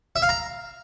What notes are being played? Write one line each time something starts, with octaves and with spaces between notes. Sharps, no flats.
E5
F5
A#5